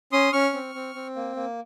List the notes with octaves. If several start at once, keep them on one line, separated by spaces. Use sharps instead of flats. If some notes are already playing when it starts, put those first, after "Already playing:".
C#4 C6 D#6
C#4 C#6 F6
C4
C4
C4
A#3
A#3